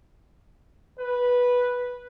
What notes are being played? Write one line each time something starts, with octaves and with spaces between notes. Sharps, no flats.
B4